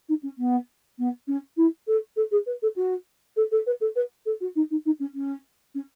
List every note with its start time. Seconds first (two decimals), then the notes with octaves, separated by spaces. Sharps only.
0.09 D#4
0.23 C#4
0.38 B3
0.99 B3
1.28 C#4
1.57 E4
1.87 A4
2.16 A4
2.31 G#4
2.46 B4
2.62 A4
2.76 F#4
3.37 A4
3.52 A4
3.67 B4
3.81 A4
3.96 B4
4.26 A4
4.41 F#4
4.56 D#4
4.71 D#4
4.86 D#4
5.00 C#4
5.14 C#4
5.75 C#4